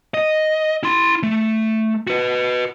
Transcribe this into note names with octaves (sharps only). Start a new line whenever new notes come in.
D#5
E4 C6
A3
F#4 B4